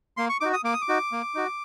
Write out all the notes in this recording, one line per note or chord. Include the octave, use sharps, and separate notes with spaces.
A#3 C6
C#6
D#4 F#4 D6
D#6
A#3 D6
D#6
D6
D#4 F#4
A#3
D#4 F#4